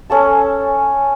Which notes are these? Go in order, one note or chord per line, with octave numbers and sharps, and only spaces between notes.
C#4 A4 A5